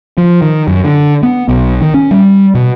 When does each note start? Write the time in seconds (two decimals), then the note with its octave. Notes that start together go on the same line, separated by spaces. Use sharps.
0.18 F3
0.42 D#3
0.68 F#2
0.84 D3
1.23 B3
1.48 B1
1.82 D#3
1.94 C#4
2.11 G3
2.55 B2